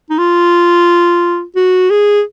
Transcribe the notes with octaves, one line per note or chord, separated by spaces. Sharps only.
D#4
F4
F#4
G#4